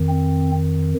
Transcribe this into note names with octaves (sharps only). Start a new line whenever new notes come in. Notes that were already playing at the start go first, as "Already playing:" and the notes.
Already playing: F2 D#3
C4